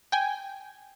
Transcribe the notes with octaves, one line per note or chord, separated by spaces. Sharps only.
G5 G#5